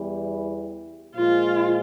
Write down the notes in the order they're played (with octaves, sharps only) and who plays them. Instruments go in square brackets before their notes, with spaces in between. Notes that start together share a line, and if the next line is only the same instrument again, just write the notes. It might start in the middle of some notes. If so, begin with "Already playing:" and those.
Already playing: [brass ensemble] E2 E3 G3
[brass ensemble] A#2 F3 G#3 [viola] F4